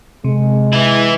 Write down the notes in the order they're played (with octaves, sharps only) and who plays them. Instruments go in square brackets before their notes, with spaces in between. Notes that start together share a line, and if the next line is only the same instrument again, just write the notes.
[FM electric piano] C3 [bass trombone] G#3
[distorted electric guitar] E3 E4